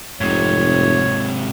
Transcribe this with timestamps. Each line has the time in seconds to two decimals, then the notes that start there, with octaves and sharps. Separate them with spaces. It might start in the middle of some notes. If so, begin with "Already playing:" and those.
0.21 F1 G#2 C3 C#5